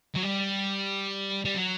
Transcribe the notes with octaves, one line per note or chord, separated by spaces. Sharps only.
F#3
G3
G3
F#3